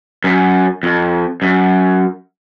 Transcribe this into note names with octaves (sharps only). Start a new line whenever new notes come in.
F#2
F2
F#2